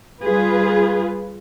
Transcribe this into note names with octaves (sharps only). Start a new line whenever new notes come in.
G3 F4 G#4 B4